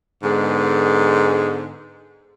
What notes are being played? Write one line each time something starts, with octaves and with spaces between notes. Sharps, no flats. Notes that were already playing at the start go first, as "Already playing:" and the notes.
G#2 D3 G#3 B3